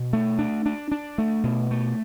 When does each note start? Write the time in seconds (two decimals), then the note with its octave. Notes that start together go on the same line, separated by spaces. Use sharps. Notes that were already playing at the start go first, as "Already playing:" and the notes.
Already playing: B2
0.13 A3
0.39 D4
0.66 D4
0.91 D4
1.18 A3
1.44 B2
1.71 A3